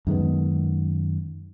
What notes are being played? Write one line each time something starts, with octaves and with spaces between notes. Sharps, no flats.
F#2 D#3 G#3 B3